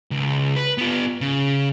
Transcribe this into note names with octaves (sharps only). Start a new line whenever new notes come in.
C#2
B4
B3 F4
C#3